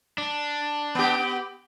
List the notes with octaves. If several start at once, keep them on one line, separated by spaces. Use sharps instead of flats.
D4
B3 G4